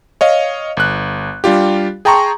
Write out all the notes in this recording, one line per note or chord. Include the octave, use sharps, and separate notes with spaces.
C#5 D#5 F5
G1 F#6
G3 D4 F4 G4
G#4 G5 A5 A#5 C6 C#6